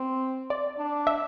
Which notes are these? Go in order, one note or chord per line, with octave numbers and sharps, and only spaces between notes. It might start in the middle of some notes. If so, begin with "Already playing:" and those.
Already playing: C4
D5
D4
E5